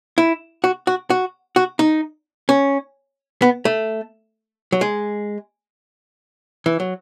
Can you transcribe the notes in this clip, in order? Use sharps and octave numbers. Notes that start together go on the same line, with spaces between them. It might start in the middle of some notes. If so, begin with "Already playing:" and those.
E4
F#4
F#4
F#4
F#4
D#4
C#4
B3
A3
F#3
G#3
E3
F#3